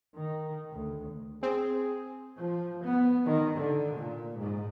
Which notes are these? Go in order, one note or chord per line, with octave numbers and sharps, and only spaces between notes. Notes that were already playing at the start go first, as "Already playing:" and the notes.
D#3
D2
C4 G#4
F3
B3
D#3
D3
A#2
G#2